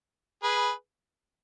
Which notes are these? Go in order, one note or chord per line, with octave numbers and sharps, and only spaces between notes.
G#4 B4